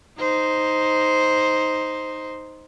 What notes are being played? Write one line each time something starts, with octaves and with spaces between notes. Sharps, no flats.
D#4 C5